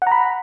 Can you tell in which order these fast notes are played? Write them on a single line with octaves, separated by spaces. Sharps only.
F#5 A#5 B5